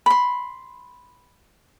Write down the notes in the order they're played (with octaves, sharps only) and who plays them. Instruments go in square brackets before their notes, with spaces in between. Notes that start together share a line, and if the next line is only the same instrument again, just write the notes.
[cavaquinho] B5 C6